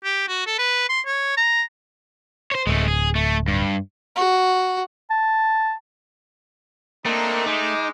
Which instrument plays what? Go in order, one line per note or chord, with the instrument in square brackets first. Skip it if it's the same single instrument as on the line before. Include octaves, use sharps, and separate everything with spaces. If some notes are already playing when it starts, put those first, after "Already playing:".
[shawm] G4
F#4
A4
B4
C6
C#5
A#5
[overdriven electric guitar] C5 C#5
[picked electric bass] D1 [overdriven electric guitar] G#3 A3
[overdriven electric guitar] G#4
A3
G2
[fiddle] F#4
[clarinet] A5
[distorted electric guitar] A3 [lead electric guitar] A#3 [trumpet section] C4 D4 D#4
[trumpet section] G#3 D6 [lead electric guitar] D#4